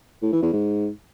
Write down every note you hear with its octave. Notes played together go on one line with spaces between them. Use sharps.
A2
E3
E2
G#2